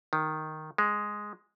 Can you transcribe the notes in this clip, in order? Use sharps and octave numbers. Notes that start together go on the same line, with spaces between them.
D#3
G#3